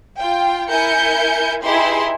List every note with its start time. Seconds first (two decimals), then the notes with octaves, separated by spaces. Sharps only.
0.19 F4 G5
0.69 E4 A#4 G#5 G6 C#7
1.63 D#4 E4 G4 G#4 B4 C6